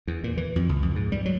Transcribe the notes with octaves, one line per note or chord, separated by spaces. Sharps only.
E2
A#2
E3
F2
C#2
F2
G#2
G3
F#3